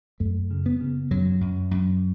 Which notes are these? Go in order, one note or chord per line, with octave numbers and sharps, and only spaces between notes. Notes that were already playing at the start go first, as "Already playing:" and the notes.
F#2 A3
C#3
B3
C#3
F#2 F#3
F#2
F#2